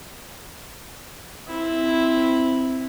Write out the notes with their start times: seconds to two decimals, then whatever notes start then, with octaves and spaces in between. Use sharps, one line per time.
1.48 C4 E4